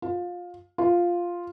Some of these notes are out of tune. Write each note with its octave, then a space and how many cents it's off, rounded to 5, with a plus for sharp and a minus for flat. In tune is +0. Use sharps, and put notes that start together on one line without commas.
F4 +20
F4 +0